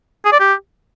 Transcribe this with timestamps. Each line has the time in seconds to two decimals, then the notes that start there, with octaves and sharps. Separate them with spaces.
0.25 G#4
0.32 D5
0.40 G4